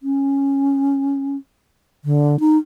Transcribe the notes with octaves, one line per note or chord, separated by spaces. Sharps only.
C#4
D3
D#4